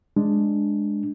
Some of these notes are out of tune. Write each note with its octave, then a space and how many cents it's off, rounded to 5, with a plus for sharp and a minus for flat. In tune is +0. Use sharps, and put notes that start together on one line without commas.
G#3 +0 D4 +0